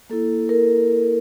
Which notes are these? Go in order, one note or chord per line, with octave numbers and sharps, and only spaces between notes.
A#3 E4 A4
A#4